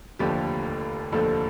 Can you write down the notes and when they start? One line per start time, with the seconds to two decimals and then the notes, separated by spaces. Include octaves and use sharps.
0.19 F1 D#2 D3 F3 A3 G4
1.12 F1 D#2 D3 F3 A3 A4